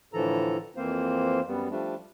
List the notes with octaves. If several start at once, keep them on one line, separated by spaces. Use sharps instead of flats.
A2 D3 E3 F3 A4 A#5
F2 E3 A#3 C4 C5 F5
F#2 G3 B3
F3 G3 A3 D4